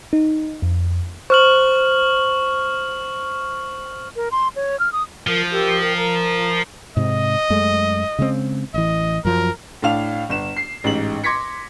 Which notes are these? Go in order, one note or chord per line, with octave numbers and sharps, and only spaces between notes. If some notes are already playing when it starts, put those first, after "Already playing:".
D#4
F2
C5 C#6 F6 F#7
A#4
C6
C#5
F6
D#6
F3 F4 A#4
G4 A#4 E6
A#4 G5
F4 A#4 A#5
G#2 C3 D#5
F#2 G#3 A3
C#3 G#3 C4
A1 E3 D#5
F#2 F3 F#3 A#4
A2 D4 F5 F7
G1 E7
C7
A1 G#2 F#7
C6 D6 G#6 A#6 B6 C#7